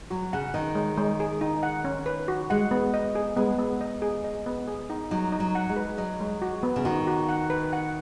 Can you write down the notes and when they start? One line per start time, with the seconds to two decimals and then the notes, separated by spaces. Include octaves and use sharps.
0.11 F#3 F#4
0.33 C#3 F#5
0.54 D#3 D#5
0.75 G#3
0.98 G#3
1.20 G#4
1.41 D#4
1.63 F#5
1.84 C#4
2.06 B4
2.28 F#4
2.50 G#3 F#5
2.71 B3
2.94 D#5
3.15 G#4
3.36 G#3 B3
3.59 B3
3.81 D#5
4.02 G#4
4.24 D#5
4.46 B3
4.67 G#4
4.90 D#4
5.11 F#3 D#4
5.32 D#4
5.40 F#3
5.55 F#5
5.69 G#3
5.76 B4
5.98 F#3 D#5
6.20 G#3
6.42 F#4
6.63 B3
6.76 C#3
6.85 D#3 F#4
7.07 F#4
7.29 F#5
7.50 B4
7.73 F#5